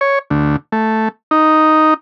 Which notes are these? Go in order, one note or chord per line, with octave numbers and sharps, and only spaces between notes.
C#5
D2
A3
D#4